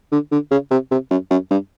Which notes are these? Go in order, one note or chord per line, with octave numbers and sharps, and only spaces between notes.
D3
D3
C#3
C3
C3
F#2
F#2
G2